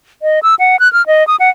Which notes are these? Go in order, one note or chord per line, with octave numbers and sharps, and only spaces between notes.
D#5
E6
F#5
F#6
F6
D#5
D#6
F#5